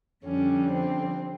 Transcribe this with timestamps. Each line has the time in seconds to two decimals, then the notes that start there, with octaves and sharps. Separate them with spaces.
0.25 F2 D3 G3 C#4
0.73 C4